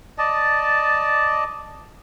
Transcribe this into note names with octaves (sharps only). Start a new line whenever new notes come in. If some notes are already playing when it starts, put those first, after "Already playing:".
D5 D#5 A5